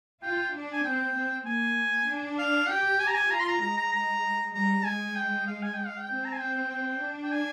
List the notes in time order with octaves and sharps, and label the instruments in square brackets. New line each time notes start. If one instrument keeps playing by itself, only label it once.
[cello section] F4 [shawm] G5
[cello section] D4
[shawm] G#5
[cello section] C4 [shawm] G5
[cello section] C4
[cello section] A#3 [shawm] G#5
[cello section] D4
[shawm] F5
[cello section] G4 [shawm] G5
[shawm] G#5
A#5
G#5
[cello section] F4 [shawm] A#5
[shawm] C6
A#5
[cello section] G#3 [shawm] A#5
[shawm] A#5
A#5
[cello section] G3 [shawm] A#5
[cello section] G#3 [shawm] G#5
[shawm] G5
F5
G#5
G5
F5
G5
[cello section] C4
[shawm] A#5
G#5
G5
G5
[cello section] D4
[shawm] G5
G#5